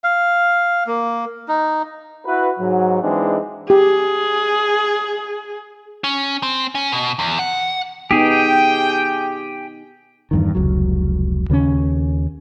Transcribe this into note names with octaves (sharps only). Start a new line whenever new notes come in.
F5
A#3
D#4
E4 F#4 B4
G#2 F#3
E3 G#3 C4 D4 D#4
G4 G#4
C#4
C4
C#4
B2
E2
F#5
B3 D#4 G4 G#4 G5
E2 G2 D#3
F1 C#2 F#3
D#2 C#3 B3 C#4